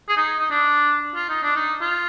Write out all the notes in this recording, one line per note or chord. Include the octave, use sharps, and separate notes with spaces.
G#4
D#4
D#4
D4
F4
D#4
D4
D#4
F4